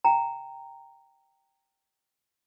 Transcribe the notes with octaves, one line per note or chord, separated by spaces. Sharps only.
G5 A#5